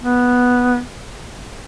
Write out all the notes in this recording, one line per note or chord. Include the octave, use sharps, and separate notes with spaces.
B3